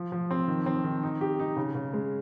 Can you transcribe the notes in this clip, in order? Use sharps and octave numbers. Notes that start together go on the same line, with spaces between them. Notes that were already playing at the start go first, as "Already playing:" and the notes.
Already playing: F3
F3
C4
D#3
C4
D#3
D#4
G4
D#4
C#3
C#3
G#3